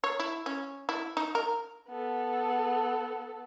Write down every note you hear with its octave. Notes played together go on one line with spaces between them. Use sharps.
C#5
E4
C#4
E4
D#4
A#4
B3 A4